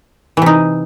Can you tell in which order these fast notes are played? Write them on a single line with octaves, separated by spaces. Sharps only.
E3 C3 D#4